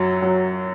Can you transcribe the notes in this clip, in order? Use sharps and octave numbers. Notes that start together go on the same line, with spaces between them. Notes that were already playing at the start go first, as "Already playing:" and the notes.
Already playing: F#2 F#3
F#3